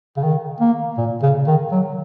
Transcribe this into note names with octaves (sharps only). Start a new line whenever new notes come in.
C#3
D#3
A#3
A#2
C#3
D#3
F#3